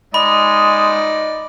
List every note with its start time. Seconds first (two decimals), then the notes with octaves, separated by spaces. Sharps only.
0.14 G#3 D#4 D5 D#5 B5